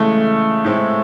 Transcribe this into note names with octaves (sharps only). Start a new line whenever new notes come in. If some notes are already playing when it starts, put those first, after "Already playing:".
Already playing: C#3 E3 G#3 A3
A2 G#3 C4 E4